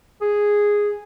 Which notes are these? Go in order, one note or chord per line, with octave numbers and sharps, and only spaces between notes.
G#4